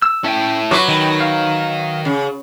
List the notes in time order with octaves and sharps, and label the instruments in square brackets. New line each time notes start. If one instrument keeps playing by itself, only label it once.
[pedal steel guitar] E6
[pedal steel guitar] C#4 E5 G5 [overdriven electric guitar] E4 A4
[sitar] F#3 B4 [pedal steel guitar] F4 C#6 D6
[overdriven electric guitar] D#3 [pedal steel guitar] D#5 G5 B5
[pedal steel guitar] F5
[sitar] C#3